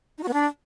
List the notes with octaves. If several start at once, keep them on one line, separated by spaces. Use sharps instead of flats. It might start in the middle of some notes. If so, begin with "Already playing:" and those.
D#4
F#4
B3
D4